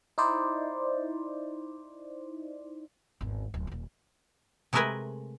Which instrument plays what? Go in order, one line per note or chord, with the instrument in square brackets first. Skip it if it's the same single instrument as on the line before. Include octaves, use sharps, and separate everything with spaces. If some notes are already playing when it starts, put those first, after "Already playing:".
[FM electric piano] D#4 E4 C5 D5
[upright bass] G#1 E2
D1
D#1 D#2
[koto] C3 G#3 A3 A#4 B4 G#5